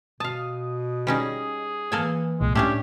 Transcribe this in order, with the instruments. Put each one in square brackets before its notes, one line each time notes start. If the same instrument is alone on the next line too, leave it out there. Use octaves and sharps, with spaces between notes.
[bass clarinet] B2 [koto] F5 A5 [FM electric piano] D#6
[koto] G3 C#4 D#4 [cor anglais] G#4
[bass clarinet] E3 [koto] A#3 A4 G#5
[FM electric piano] C2 A#2 [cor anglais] G#3
[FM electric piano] A2 [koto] A3 C#4 D4 [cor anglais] G4